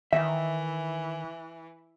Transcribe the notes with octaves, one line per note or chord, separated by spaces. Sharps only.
D#3 E3 E5